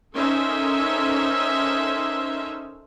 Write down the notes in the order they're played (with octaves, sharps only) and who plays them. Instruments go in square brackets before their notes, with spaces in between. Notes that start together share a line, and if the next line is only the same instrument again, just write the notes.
[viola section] C#4 D#4 A4 A#4 C5 E5